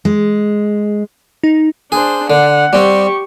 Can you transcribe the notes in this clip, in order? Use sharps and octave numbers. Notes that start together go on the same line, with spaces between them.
G#3
D#4
D4 G#4 C5
D3 F#5
G3 C4 G4 C#6